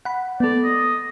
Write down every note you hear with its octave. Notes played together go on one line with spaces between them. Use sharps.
F#5 B5
B3 A4 D5
D#5